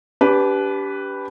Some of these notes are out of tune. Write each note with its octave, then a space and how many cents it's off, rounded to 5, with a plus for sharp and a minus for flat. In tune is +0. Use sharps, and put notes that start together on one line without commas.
D4 -35 G4 +0 B4 +0